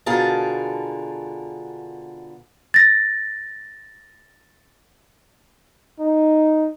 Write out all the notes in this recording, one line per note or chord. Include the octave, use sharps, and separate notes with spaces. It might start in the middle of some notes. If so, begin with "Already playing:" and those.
B2 D3 F4 G#4 A#4 A5
A6 A#6
D#4